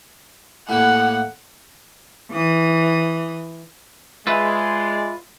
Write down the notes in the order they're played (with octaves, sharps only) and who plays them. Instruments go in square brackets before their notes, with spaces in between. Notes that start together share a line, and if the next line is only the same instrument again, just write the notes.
[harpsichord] A2 A#3 [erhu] F#5
[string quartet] E3 D#6
[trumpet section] G#3 [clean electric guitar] F4 B4 [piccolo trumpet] D5 [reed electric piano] E5 C6 E6